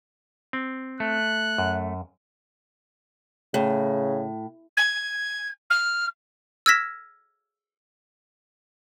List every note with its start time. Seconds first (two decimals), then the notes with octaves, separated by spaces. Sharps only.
0.53 C4
1.00 A3 F#6
1.58 F#2
3.54 A2 C#3
4.77 G#6
5.70 F6
6.66 E6 F6 G#6 A#6 B6 E7